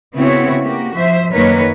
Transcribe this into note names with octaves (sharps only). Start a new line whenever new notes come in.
C#3 B3 C4 E4 F#4 C#5
A#3 F#4 G4
F3 C5 E5
F#2 D#3 A#3 A#4 B4 C#5